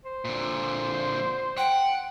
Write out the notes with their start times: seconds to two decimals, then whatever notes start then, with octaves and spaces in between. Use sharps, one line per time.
0.05 C5
0.25 A#2 D3
1.58 F#5 G5